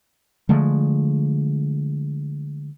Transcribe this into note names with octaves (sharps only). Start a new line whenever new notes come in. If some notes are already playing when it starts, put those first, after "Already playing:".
D3 F3 G#3 A3